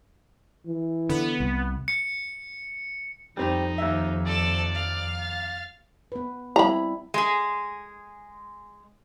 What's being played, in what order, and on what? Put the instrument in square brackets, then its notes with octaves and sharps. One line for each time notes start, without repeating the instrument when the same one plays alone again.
[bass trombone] E3
[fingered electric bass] D3 [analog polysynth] B3
[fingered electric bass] C2
[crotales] C#7
[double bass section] F2 [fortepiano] G3 C4 G4 [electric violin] D#4
[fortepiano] D#2 E5
[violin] A4 E7 [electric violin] D5
[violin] F5
[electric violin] A6
[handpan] B3 B4
[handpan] G3 C4 E4 [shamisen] A#5 B5
[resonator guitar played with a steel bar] G#3 G#4